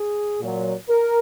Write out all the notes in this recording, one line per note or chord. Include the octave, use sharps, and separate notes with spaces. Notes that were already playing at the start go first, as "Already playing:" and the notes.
Already playing: G#4
A#2 F#3
A#4